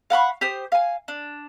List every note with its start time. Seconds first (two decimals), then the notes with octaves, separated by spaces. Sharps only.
0.10 F5 F#5 B5 C#6
0.41 G4 C5 D#6
0.72 F5 G#5
1.08 D4